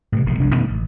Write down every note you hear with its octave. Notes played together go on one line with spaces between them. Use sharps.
A2 C3 E3
E1 A#1 A2 C3
F1 C2 F2 D4
A#2 D#3 G#3 A3
A1